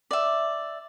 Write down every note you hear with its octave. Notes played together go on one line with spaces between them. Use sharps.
D5 E5